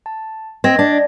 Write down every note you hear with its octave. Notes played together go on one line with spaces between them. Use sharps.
A5
C4 D#5 G#6 A#6
D4